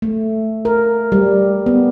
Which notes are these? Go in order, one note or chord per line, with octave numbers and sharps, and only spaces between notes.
A3
A#4
G3
B3